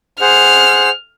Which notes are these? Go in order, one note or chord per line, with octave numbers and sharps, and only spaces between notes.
G#4 C5 F#5 F6